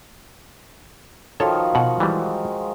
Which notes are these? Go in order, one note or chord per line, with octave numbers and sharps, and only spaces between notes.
D#3 F3 F#4 A4 C#5
B2 F#5
E3 G3 G#3